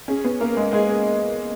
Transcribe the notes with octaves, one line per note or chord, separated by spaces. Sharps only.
C#4 G#4
B3
A#3 A#4
G#3
G#3 G#4